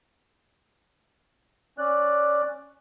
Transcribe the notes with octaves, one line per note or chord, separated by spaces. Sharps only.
C#4 D5 F#6